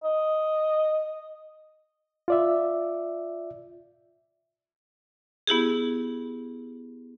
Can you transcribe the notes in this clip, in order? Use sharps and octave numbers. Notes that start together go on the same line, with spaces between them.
D#5
F4 D5 E5
B3 E4 G4 G#4